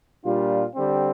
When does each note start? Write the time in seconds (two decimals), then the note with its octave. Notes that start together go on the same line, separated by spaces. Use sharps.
0.24 A#2 G3 D4 F4
0.74 D3 G3 C4